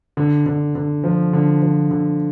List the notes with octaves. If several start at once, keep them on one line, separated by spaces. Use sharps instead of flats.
D3
D3
D3
F3
D3
F3
D3